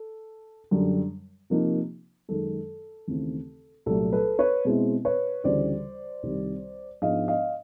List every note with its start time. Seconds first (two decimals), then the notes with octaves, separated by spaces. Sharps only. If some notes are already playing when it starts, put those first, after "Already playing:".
Already playing: A4
0.71 F#2 D3 G3
1.50 C3 F3 A#3 D#4
2.29 F#2 D#3 G#3 A4
3.08 D#2 C#3 E3 A3 C4
3.86 C2 A#2 F#3 A3 A4
4.13 A4 B4
4.39 B4 C#5
4.65 B2 G#3 C4 E4
5.05 B4 C#5
5.44 D2 C#3 E3 G3 C5 D5
6.23 C2 C3 D#3 G3
7.02 G#2 F3 G#3 B3 D4 D#5 F5
7.28 D#5 F5